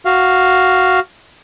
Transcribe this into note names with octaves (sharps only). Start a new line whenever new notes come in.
F#4 F5